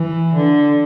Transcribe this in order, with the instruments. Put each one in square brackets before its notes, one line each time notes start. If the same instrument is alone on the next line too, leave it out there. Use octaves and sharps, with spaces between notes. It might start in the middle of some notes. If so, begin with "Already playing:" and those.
Already playing: [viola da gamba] E3
D3